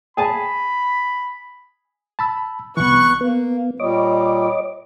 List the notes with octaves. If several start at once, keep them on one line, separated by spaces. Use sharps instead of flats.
G#4 G#5 A5 B5
A5 B5 E6
C2 E3 B3 C#6 F#6
A#3 B3
A#2 G3 C#5 D#5 D6